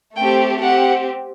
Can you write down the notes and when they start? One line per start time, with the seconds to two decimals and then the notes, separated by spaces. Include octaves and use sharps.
0.18 A3 C4 G4 G5
0.61 C4 G4 F#5